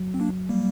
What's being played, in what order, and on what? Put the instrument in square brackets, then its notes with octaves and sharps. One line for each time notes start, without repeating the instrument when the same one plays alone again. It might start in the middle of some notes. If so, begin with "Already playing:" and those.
Already playing: [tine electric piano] F#3
[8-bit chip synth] C4
A#3 D4
G3 A#3